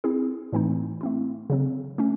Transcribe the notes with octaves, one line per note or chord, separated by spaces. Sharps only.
C4 E4 G#4
A2 E3 A3 C4 D#4
A3 C4 E4
C#3 F#3 C4
A3 C#4